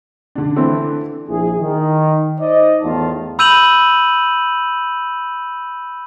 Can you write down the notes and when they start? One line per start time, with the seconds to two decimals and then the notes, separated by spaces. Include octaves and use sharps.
0.35 D3 D4
0.56 E3 A3 C4
1.28 A#1 E4 G#4
1.59 D#3
2.40 D#4 C5 D5 D#5
2.82 E2 A2 D#3 F4 A5
3.39 B5 E6 G6 D#7 F7 F#7